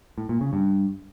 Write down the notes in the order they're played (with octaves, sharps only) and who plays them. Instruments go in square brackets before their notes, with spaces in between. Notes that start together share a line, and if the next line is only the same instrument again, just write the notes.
[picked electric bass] A2
A#2
C#3
G2